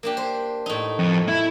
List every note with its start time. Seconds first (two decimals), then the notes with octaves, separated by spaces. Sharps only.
0.03 A#3 D4 G4
0.17 C5
0.66 A2 D#4
0.99 F2
1.28 E4